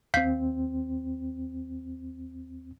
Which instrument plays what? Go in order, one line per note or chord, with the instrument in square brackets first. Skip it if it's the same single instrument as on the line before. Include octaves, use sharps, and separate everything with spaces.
[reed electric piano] D#2 C4 [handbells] F5 G6 B6